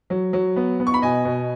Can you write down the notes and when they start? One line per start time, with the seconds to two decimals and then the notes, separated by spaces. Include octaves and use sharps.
0.10 F#3
0.33 F#3
0.56 B3
0.80 B3
0.87 C#6
0.94 B5
1.02 B2 D#5 G#5
1.25 B2